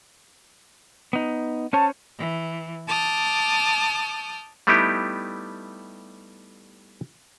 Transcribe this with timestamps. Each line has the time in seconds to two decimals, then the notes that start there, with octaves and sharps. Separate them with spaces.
1.13 B3 D#4
1.73 C#4 C5 C#5 A5
2.18 E3
2.88 A5 D6 D#6 F6 G6
4.67 G3 A3 B3 D#4 E4 G4